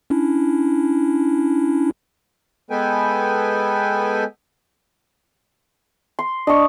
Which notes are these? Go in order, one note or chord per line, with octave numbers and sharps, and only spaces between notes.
C#4 D4 E4
G#3 B3 A4 B4 G5 G#5
C6
D4 D#5 C#6